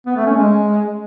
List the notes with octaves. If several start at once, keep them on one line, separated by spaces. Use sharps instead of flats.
B3
A3
C#4
G#3